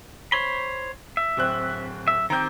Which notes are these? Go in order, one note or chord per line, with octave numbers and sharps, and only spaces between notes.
C5 C#5 B5 G7
E5
D1 C4 F#6
E5
D#3 C4 G4 A#5 G6